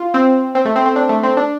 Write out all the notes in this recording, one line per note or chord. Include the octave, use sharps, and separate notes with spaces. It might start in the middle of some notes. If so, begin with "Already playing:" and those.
Already playing: F4
C4
C4
A3
C4
C4
D4
A3
C4
D4